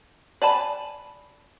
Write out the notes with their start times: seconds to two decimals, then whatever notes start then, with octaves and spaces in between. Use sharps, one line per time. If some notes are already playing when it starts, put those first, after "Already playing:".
0.42 D5 G#5 A5 B5